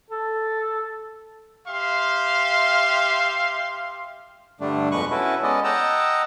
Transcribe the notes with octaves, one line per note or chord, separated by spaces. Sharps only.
A4
G4 E5 F5 C6
G2 D3 G3 A3 D4
F2 B2 G#3 B4 C#6 F#6
C#4 E4 F#4 A4 B4
G#3 B3 C#4 A4 D5 D#5
D#5 F#5 G5 A5 A#5 E6